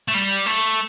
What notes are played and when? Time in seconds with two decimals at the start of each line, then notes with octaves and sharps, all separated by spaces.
0.08 A3
0.14 G3
0.46 A3